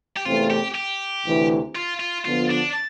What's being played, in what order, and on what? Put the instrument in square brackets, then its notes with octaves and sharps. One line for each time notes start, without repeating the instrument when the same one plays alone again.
[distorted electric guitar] G4
[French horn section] E2 C3 E3 A3 C4 [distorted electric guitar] F4
[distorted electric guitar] G4
G4
[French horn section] D2 C3 E3
[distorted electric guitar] F4
F4
[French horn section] D3 F3 B3 [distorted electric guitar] F4
[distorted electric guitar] D4